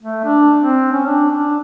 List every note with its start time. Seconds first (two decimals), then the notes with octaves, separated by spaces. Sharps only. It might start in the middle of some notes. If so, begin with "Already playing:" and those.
0.03 A3
0.25 D4
0.62 C4
0.92 C#4
1.06 D4
1.31 D4